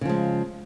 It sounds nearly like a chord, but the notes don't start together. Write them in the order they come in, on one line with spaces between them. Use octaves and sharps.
C#3 F3 G#3